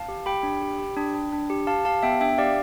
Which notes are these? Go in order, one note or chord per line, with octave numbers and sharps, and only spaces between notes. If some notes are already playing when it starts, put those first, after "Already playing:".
Already playing: F5 A5
G4
G4 G5 B5
D4
G4
G4
D4
D4
D4
G4
G4 F5 A5
G4 F5 A5
B3 E5 G5
D4 E5 G5
G4 D5 F5